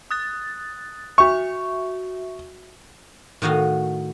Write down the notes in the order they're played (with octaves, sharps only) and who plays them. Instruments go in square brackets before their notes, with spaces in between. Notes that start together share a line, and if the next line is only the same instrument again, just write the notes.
[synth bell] D#6 F#6 A6
[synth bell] F#4 E5 [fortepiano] C#6
[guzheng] A2 D#3 F#4 D#5 F5